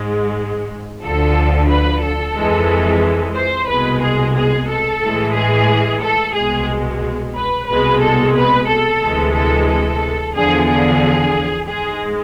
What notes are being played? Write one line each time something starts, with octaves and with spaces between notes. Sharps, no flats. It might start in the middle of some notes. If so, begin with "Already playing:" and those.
Already playing: G#2 G#3
D2 D3 F3 A4
B4
A4
F2 E3 G#3
C5
C2 B2 G#3 B4
G#4
G#4
A4
A2 E3 G#3
G#4
A4
C2 B2 G#3 G#4
B4
C2 B2 G#3 B4
A4
B4
A4
D2 C3 E3 G#3
A4
A4
E2 D3 F3 G#4
G#4
G#2 G#3 G#4